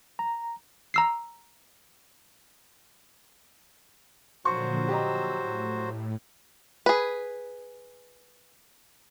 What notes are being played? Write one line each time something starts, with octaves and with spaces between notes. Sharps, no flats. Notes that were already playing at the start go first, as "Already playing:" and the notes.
A#5
A#5 E6 C7
A#2 D3 F3 F#3 F#4 C5 C#6
G4 D#5 A#5 E6
A2
G#4 B4